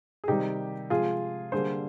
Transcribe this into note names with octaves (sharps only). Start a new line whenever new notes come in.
G#4
C3 D#3 G3 D#4 G4
C3 F3 G#3 F4 G#4
D3 G3 A#3 G#4 C5